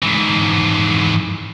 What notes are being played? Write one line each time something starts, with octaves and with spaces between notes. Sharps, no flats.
G#2 E3